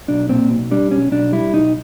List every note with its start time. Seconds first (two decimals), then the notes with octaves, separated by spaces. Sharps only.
0.08 B1 D4
0.29 A#2 C4
0.50 B1
0.71 G3 D4
0.91 B1 C#4
1.12 B1 D4
1.32 G3 E4
1.53 B1 D#4